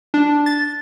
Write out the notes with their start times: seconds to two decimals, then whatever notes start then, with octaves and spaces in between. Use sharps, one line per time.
0.14 D4
0.46 A6